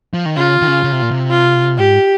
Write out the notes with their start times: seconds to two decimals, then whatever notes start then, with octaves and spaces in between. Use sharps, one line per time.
0.14 F3
0.26 D#3
0.37 C#3 F4
0.62 D#3
0.68 C#3
0.84 C#3
0.92 C3
1.02 A#2
1.11 C3
1.31 F4
1.78 G#2 G4